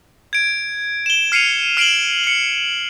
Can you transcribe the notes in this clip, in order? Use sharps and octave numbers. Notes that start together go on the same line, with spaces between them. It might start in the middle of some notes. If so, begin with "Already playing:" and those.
G#6 D7
E7 G7
F6 C7 C#7 D#7 F7
F6 C7 D7 E7 F#7 G7
C#7 F#7